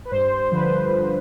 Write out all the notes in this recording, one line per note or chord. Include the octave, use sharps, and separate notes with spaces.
B4
G2 C5
D3 F3 B4
C5